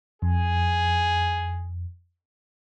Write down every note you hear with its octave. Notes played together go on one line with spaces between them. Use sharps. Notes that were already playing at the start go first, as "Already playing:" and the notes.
F2 G#4